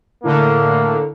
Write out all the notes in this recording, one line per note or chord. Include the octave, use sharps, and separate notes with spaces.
A2 D3 A#3